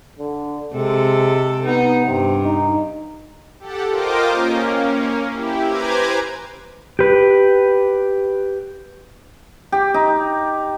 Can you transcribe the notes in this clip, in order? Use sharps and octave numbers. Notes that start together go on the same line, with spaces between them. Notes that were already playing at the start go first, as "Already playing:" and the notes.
D3
C3 G#3 A4
B3 D#4
G2 C3
D#4
G4 A4 F#5
F4 A#4 C5 D#5 G5 D6
A#3 C#4
E4 G4
B4 C5 G#5 A#5 D6 G#6
G4 B4
G4
D#4